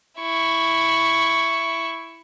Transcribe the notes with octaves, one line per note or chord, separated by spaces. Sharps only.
E4 C#6